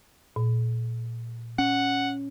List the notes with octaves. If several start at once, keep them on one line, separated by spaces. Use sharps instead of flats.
A#2
C#4 F#5